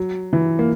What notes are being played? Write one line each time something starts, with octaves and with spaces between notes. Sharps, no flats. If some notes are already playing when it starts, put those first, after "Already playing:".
Already playing: F#3
E3
A#3